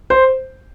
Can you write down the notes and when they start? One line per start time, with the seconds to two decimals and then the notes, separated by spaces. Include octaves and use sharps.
0.10 C5